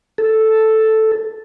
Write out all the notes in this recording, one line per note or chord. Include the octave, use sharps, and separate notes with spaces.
A4